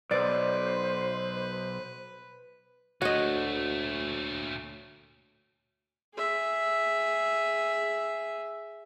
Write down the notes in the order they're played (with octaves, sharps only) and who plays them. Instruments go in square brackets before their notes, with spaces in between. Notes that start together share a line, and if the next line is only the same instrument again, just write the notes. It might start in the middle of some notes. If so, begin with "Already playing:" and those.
[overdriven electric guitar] B1 [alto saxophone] B4 [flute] C5 [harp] D5
[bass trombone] D2 [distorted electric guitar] A#2 A3 [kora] F#4 D#5 [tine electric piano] C#5
[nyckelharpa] G#4 E5